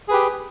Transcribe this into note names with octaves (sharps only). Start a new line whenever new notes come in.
G4 G#4 B4